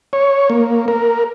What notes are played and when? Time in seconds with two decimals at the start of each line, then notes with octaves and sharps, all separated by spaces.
0.13 C#5
0.50 A#3
0.88 A#4